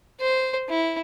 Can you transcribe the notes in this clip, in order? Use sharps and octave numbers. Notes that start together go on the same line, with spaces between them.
C5
E4